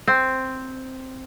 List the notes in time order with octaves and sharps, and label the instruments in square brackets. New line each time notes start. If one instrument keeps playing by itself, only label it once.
[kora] C4